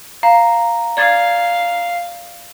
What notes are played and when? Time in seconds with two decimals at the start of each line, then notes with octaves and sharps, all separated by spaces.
0.23 F5 A#5
0.97 D5 F5 G#6 A6